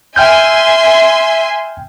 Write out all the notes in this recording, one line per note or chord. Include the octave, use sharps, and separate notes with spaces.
E5 G5 G#5 C6 F6 G6